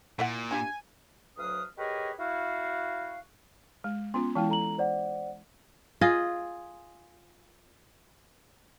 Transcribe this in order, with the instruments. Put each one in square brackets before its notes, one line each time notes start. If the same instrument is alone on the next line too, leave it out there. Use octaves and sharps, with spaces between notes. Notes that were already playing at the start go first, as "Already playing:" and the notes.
[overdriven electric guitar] A#2 [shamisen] E4 E5 F#5
[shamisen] D4 F4 G4 [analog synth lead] G#5
[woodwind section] D2 F#3 B4 F5 D#6
G4 G#4 A#4 B4 C#5 D#5
E4 F#4 F5
[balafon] G#3
[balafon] B3 C#4 F4 [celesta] C6
[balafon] E3 G#3 E4 [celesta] G5 A5
[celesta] A4 A#5 F#7
C5 D5 F#5
[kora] F4 G#4 D#5